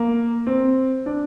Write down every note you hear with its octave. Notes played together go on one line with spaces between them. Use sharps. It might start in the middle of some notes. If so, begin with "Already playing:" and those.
Already playing: A#3
C4
D4